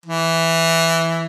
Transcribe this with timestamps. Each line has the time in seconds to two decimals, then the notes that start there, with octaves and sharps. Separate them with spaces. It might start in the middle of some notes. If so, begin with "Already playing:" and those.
0.06 E3